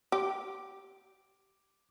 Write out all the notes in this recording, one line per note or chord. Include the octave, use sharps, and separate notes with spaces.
G4 D6